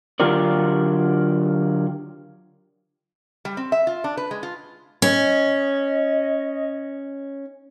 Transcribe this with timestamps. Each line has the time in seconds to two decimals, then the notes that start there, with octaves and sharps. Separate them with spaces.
0.20 D3 F#3 F4 G4 A#4 D5
3.45 G3
3.57 C4
3.72 E5
3.87 F4
4.04 D4
4.17 B4
4.31 G#3
4.43 F4
5.02 C#4 D#5